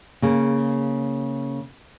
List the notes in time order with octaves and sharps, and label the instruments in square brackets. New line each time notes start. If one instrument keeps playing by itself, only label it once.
[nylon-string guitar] C#3 A#3